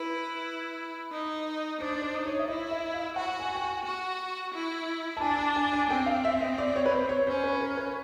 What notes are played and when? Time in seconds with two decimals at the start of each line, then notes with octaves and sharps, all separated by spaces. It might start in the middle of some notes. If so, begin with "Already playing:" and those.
Already playing: E4 B4
1.11 D#4
1.80 D4 C5
2.02 C5
2.14 D#4
2.26 C#5
2.39 E5
2.48 E4 D#5
2.71 E5
2.94 F5
3.16 F#4 F#5
3.40 G#5
3.56 G5
3.62 G#5
3.84 F#4
4.54 E4
5.17 A5
5.21 D4 G#5
5.38 A5
5.56 G#5
5.73 G#5
5.90 C4 G5
6.06 F5
6.25 E5
6.41 D#5
6.58 D5
6.76 C#5
6.86 B4
6.93 C5
7.09 C#5
7.27 C#4 C5
7.44 B4
7.61 A#4
7.77 B4